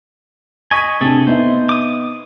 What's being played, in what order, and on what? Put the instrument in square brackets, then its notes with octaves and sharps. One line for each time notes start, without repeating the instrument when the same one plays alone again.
[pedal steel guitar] D#5 G#5 [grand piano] C#6 B6 D#7
[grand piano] C3 D4 [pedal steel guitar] A3 G#4 A4
[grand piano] B3 D#4 E5 [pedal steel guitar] C5
[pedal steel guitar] D6 D#6